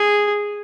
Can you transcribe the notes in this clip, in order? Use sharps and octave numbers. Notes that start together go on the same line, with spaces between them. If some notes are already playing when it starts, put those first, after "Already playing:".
Already playing: G#4